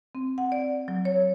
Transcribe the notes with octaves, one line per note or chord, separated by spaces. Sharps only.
C4
F#5
D5
F#3
C#5